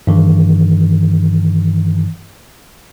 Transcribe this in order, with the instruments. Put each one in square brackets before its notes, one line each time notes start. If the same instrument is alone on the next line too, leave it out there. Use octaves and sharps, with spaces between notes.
[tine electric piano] G2 D#3 E3